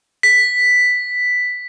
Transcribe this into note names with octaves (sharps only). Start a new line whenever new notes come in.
B6